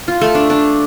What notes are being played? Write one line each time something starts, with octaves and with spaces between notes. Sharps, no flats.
F4
A3
D4
D4